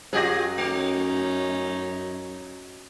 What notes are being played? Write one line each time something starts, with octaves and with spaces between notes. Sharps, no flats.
F#2 F#3 F4 G4 G#4 D#5 A#6
A3 C#4 D#4